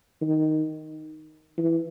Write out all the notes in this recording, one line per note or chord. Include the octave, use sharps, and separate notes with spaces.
D#3
E3